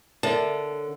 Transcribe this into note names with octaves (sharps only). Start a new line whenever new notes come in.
D3 A#4 C#5 E5 A5